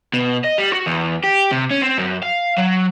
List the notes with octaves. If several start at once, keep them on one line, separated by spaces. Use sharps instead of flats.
B2
D#5
G3
F#4
E2
G4
C3
C#4
C4
F#2
F5
F#3